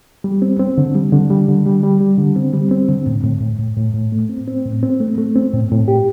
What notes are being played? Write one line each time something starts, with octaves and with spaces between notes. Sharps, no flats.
G3
C4
C4
D3
G3
D3
G3
D3
G3
G3
G3
D3
C4
G3
C4
D3
A2
A2
A2
A2
A2
A2
A3
C4
C4
A2
C4
A3
A3
C4
A2
A2
G4